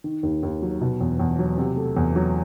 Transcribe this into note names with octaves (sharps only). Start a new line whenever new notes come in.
D#3
D#2
D#2
F#3
B2
E2
E2
F#3
C3
A3
E2
F#3